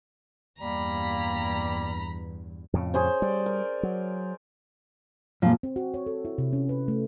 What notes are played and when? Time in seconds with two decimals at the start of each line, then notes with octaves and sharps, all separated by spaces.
0.60 E2 G2 G3 A#3 A#5 B5
2.73 F2 A2 C#3
2.94 G#4 C5 C#5
3.22 G3 D5
3.46 A#4
3.83 F#3
5.42 F#2 A#2 F3
5.63 C4
5.76 F#4
5.94 C#5
6.06 A4
6.25 E4
6.38 C3
6.53 C#4
6.69 B4
6.88 A3